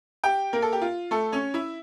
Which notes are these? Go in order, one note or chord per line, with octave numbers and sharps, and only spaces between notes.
G4 G5
A#3 A#4
A4
G4
F4
A3 A4
C#4 C#5
E4 E5